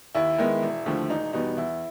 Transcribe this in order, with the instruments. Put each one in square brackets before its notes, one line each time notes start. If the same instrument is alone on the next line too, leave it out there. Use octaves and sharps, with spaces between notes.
[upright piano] D#2 E4
D#3 G#3 B3
E1
D#2 D3 F3 A3
E1 D#4
E2 B2 G3 B3 D#4
E2 E4